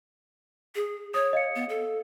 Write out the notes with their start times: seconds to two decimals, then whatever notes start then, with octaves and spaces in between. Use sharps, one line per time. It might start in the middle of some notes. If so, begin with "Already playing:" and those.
0.75 G#4
1.14 C#5 D#6
1.33 D#5 F5 C#7
1.55 B3
1.69 A4